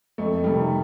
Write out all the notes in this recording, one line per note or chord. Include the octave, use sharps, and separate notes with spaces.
F2 A3
C3 D#3 G3